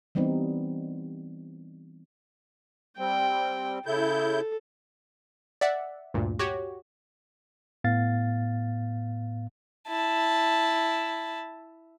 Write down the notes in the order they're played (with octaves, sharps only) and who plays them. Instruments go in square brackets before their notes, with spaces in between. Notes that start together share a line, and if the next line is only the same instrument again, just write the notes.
[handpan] E3 G3 B3 C4 D#4
[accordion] G3 C4 [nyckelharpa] G5
[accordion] C#3 E4 G6 [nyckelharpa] A4
[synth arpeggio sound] D5 E5 F#5
D2 G2 A#2
F#4 G4 C#5
[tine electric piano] A2 B3 F5 A6
[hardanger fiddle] E4 A5